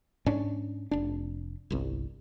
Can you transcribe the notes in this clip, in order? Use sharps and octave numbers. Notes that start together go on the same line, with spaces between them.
G#2 C#4 D4
F1 D4
G1 C2